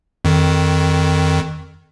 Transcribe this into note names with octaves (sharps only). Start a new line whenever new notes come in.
F2 D#3